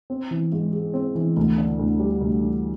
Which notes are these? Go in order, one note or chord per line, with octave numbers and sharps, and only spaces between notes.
C4
E3
G#2
G#3
C4
E3
D2
D3
D2
G3
D2
D3